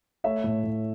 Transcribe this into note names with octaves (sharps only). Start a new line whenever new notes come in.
A3 C#5 E5
A2
A2